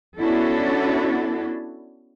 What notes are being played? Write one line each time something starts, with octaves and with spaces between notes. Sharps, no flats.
B3 C#4 D4 E4 F#4 A4